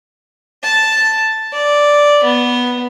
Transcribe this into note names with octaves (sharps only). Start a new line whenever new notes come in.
A5
D5
B3